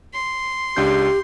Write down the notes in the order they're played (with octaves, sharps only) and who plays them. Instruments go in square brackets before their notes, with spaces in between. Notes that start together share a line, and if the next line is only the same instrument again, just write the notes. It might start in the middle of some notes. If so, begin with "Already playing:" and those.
[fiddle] C6
[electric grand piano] C#2 D4 G6 [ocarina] G4